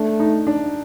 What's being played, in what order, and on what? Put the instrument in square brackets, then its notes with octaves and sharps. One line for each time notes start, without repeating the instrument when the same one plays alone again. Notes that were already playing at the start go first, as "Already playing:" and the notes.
Already playing: [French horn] A3 [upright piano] D4
[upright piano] D#4
D4